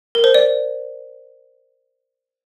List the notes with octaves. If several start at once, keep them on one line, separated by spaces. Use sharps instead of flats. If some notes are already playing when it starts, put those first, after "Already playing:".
A#4
C5
D5